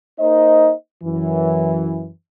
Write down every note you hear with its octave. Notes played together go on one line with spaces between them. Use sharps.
A#3 D#4 C5 D#5
F#2 E3